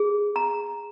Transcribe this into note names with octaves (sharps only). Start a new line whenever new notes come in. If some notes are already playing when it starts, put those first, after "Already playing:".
Already playing: G#4
A#5